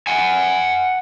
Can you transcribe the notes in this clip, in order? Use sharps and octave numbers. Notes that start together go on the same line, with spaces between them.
F#5 G#5